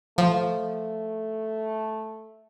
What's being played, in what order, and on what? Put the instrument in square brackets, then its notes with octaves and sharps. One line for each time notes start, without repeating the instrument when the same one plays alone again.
[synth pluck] F3 [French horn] A3